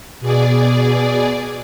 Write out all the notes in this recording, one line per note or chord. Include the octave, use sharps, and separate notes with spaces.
B2 G#4 D5